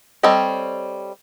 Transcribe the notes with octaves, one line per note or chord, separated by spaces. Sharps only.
G3 C4 A4 C#5 D#5